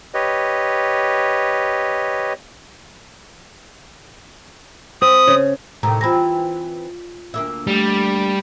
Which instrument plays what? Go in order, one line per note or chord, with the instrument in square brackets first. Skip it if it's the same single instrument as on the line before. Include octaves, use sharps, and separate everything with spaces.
[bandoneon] G4 B4 C#5 D#5
[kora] C4 [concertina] D#6
[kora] C#3
[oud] A2 C3 D#3 [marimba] A#5
[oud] E3 C4 [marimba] F4 B5 A#6
[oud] D2 A#3 E5
[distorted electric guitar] G3 [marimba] A3